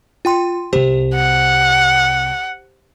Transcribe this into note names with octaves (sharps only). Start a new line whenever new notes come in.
F4 G5 C6
C2 C4 G4 C5
F#5